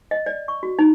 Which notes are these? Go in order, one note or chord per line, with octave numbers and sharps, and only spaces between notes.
D#5
D5
C#6
F#4
D#4